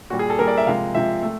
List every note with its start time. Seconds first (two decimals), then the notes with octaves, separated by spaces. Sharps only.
0.10 A#2 G3 F#4
0.19 G#4
0.30 A4
0.39 A#2 G3 A#4
0.48 D5
0.57 E5
0.67 C3 F3 G#3 F5
0.95 C3 F3 G#3 E5
1.23 A3